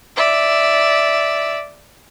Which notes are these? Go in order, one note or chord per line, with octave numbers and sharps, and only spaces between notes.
D5 E5